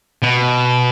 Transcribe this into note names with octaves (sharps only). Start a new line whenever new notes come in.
B2